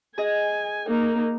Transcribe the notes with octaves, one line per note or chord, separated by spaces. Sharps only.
G#4 D#5 G#5
A#3 D#4